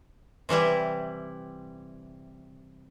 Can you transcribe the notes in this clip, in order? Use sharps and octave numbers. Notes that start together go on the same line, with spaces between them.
C3 E3 G3 E4